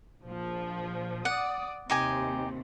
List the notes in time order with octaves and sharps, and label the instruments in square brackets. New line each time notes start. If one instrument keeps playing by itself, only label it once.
[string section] A#1 F3
[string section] D5 D#6 [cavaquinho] F#5
[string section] D#2 C3 [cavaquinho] D#4 G4 G#5